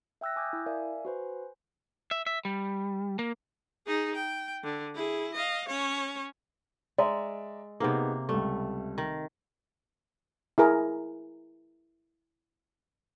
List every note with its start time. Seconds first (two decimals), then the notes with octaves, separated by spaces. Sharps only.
0.21 E5 G5 E6 F#6 A#6
0.36 G#5 D6 D#6 G6 G#6
0.53 E4 E5
0.66 A#4 D5 E5 F5 G#5
1.05 F#4 B4 C5 G#5
2.11 E5
2.27 E5
2.45 G3
3.19 A#3
3.86 D#4 G#4
4.15 G5
4.64 D3
4.95 E4 G#4
5.34 D#5 F5
5.68 C#4 C#5
6.98 G#3 D5 E5 A#5
7.80 C3 A#3 B3 D#4 G#4
8.29 C#2 G3 A3
8.98 D#3
10.58 E4 G#4 A#4